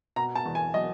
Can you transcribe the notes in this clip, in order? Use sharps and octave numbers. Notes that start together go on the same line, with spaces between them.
B2 A#5
A5
E2
G#5
F#3 D#5